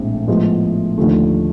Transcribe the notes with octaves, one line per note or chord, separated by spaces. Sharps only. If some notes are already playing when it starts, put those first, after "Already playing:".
Already playing: A#1 A2 F3 G#3 C4
A2 F3 G#3 B3
D#2 D3 F3 A3